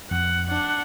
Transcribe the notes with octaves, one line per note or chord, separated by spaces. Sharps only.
F2 F#5
D4 F#5